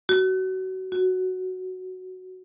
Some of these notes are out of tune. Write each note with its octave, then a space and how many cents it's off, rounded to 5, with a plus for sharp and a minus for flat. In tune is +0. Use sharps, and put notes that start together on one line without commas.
F#4 +25
F#4 +0